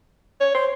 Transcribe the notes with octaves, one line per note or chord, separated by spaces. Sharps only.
C#5
C5